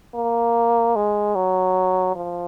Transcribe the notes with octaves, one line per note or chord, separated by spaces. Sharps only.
A#3
G#3
F#3
F3